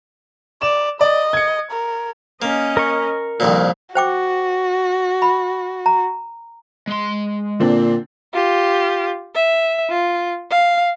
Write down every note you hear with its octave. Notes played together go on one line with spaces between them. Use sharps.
D5 E7
D5 D#5
G#6 C#7
A#4
A#3 C#4 D#5
A#4 C#6
C2 F2 A#2 D#3
F#4 C5 G5 D6
B5
A#5
G#3 C6
A#2 D3 C4 D4
F4 G4
E5
F4
F5